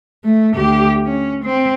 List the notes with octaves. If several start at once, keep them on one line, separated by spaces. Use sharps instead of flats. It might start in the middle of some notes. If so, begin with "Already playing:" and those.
A3
D2 G4
C#4
C4